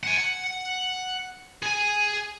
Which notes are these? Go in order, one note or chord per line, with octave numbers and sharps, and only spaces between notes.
F#5 G#5
F#5
G#4 G#5